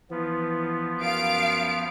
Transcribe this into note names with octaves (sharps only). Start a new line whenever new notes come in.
E3 F3 B3
F#2 F5 D7